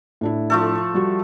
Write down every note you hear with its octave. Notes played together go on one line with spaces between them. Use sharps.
A2 D4 E4
F3 A3 A4
G3 F#4